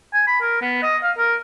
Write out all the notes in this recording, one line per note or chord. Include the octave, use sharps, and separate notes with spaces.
G#5
B5
A#4
B3
D#5
F5
A#4